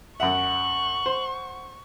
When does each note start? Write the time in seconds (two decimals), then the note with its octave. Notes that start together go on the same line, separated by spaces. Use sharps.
0.20 F#2 E5 F#5 C#6 F#7
1.06 C5